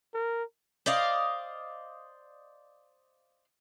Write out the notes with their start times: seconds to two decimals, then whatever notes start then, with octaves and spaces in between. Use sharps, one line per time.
0.14 A#4
0.86 C5 D5 D#5 F5